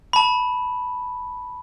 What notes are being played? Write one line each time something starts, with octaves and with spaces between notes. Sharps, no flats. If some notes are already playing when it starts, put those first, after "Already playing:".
A5 B5